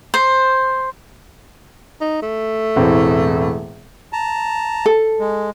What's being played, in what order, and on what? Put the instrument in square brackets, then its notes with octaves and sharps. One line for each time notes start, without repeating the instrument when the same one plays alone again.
[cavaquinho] C5
[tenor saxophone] D#4
A3
[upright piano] E1 A2 C4
[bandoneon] A5 A#5
[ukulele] A4
[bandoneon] G#3